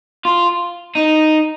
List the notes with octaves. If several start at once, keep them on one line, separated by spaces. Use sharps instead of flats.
F4
D#4